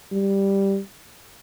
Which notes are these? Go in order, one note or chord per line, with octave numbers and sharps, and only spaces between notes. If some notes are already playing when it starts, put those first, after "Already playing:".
G3